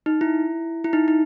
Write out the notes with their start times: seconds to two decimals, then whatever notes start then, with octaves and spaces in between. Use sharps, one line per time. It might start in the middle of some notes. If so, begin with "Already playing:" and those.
0.06 D#4
0.21 E4
0.84 E4
0.93 D#4
1.08 D#4